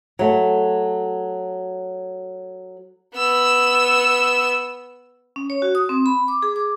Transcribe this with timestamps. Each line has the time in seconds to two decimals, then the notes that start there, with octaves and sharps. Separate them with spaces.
0.19 F#3 A3
3.14 B3 E6
5.36 C#4
5.50 C#5
5.62 F#4
5.75 D#6
5.89 C4
6.06 B5
6.28 D6
6.42 G#4
6.56 D6